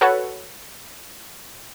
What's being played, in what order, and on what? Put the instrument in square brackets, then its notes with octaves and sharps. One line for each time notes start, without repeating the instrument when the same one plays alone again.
[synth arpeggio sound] F#4 A4 B4 C#5 F#5